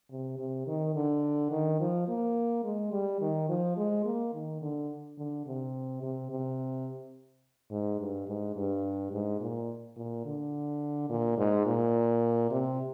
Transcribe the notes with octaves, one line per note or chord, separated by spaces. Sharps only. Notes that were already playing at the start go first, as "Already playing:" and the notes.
C3
C3
D#3
D3
D#3
F3
A#3
G#3
G3
D#3
F3
G#3
A#3
D#3
D3
D3
C3
C3
C3
G#2
G2
G#2
G2
G#2
A#2
A#2
D3
A#2
G#2
A#2
C3